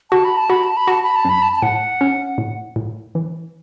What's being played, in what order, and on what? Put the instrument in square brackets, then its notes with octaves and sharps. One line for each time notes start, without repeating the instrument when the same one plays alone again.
[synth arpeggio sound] F#4 [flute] A5
[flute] B5
A5
[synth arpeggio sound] F#4 [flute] B5
[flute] A5
B5
[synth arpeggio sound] F#4 [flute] A5
[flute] B5
A5
[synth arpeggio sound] F#2 [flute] B5
[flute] A5
A5
[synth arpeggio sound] A2 [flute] F#5
[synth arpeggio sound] C#4
A2
A2
E3